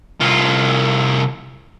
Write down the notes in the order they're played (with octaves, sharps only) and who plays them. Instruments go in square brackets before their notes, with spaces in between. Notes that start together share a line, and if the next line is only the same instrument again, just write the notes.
[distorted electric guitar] C2 F4